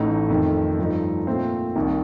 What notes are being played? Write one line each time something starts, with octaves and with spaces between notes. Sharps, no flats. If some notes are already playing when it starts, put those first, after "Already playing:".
Already playing: A1 A2 A3 D#4
F2 D#3 A3
G2 F3 A3 D#4
A#2 A3 C4 F4 C5
C2 C3 D#3